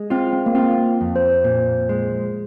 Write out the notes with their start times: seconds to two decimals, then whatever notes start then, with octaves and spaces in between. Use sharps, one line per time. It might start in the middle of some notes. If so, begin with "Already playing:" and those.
Already playing: G#3
0.10 C4 F4
0.33 C4
0.46 A#3
0.55 C4 F4
1.01 F2
1.16 C5
1.44 A#2
1.89 G#3